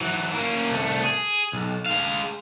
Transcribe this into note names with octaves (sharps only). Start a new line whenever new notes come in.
E3 F#3
A#3 C#4
C2 A3
G#4
B1
G#3 F5